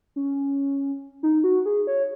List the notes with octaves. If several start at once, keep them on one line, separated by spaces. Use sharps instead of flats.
C#4
D#4
F#4
G#4
C#5